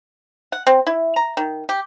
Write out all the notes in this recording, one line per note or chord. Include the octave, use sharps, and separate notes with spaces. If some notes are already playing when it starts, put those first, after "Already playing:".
F#5
C4
E4
A#5
D#3
G4